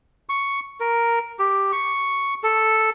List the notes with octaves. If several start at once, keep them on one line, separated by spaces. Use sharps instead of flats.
C#6
A#4
G4
C#6
A4